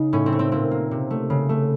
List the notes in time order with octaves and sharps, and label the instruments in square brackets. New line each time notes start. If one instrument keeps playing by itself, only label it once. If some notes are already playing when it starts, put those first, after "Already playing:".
Already playing: [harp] C#3 D#4
A2 C#4
C4
A3
C4
A#2 C4
A#3
C3
A3
C#3
A3